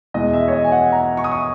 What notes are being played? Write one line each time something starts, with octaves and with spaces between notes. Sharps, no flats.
E2 B2 G#3 D#5
E5
C#5
D#5
G#5
F#5
A#5
C#6
D#6
C#6